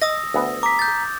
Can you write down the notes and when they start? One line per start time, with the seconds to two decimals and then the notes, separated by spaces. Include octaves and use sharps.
0.02 D#5 D#6 E6 A#6
0.34 D2 B3
0.63 A#5 D6 B6
0.79 G6 A6